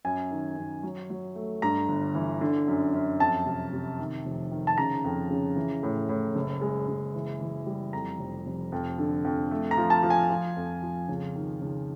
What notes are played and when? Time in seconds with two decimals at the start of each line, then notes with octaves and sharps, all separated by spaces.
0.05 F#2 G#5
0.31 D#3
0.57 F#2
0.83 F#3
1.10 F#3
1.36 A3
1.62 G2 A#5
1.88 G1
2.15 E3
2.41 D3
2.67 F#2
2.94 F#2
3.20 F2 A5
3.46 C3
3.73 C3
3.99 D#3
4.26 F1
4.51 D#3
4.67 A5
4.78 C#3 A#5
5.04 F2
5.30 C#3
5.56 E3
5.83 A2
6.09 A2
6.35 F#1
6.61 G#3
6.88 F#1
7.14 E3
7.40 E3
7.66 G3
7.93 F2 A#5
8.19 F1
8.46 F1
8.72 F2
8.98 D3
9.25 F2
9.51 A3
9.71 A#5
9.77 F3
9.90 A5
10.03 F3
10.10 G#5
10.30 F3
10.57 F2
10.82 F3
11.09 C#2
11.35 D#3
11.62 C#2